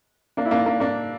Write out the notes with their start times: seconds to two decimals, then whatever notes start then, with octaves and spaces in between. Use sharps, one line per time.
0.37 A#3 D4
0.45 E4
0.51 A#3 D4
0.66 A#3 D4
0.80 A#3 D4